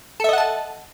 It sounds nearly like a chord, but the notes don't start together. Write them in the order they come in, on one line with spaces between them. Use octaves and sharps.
A4 E5 D#5 F#5 A5